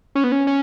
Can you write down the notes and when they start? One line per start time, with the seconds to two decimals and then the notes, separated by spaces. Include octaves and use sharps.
0.15 C#4
0.24 B3
0.32 C#4
0.47 C#4